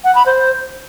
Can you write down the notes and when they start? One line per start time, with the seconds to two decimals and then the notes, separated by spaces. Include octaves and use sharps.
0.04 F#5
0.15 B5
0.26 C5